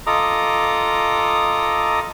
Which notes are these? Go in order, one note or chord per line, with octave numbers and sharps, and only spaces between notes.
F4 A4 D#5 A#5 D6 D#6